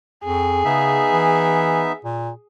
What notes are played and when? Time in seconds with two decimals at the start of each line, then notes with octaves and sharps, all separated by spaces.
0.24 F2 G#4
0.65 C#3 B3 D#4 E5
1.11 E3
2.04 A#2